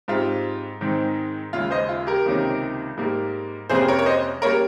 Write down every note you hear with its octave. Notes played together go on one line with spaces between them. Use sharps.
G#2 G3 C4 F4
G#2 D#3 G#3 C4
D#2 C#3 G#3 F4
C5 D#5
F4
G4 A#4
C#2 C3 D#3 A#3 C#4
G#2 G3 A#3
F2 C3 G3 A#3 C#4 G#4 C5
A#4 C#5
C#5
C5 D#5
G3 A#3 C#4 A#4 C#5